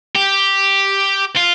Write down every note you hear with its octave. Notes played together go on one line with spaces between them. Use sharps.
G4
F4